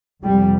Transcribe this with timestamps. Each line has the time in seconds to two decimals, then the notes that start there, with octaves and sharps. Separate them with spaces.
0.23 F2 C3 G3